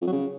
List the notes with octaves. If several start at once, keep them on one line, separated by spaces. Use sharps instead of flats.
F2
F#3
C#3